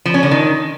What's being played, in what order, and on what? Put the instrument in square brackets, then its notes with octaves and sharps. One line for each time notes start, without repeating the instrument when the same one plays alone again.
[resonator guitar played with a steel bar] F3
C#4
D3
D#3